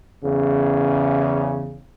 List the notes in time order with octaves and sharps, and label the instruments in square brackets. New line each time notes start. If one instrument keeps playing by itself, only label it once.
[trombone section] E2 C#3